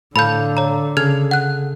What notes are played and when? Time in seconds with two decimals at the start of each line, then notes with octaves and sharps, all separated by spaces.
0.16 A2 D3 A4 F5 B5 G6
0.57 C#5 A#5
0.97 C#3 G#4 A4 F6 G#6 F7
1.31 F#5 F#6